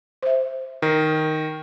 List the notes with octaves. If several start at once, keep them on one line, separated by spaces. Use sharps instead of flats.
C5 E5
D#3 A#4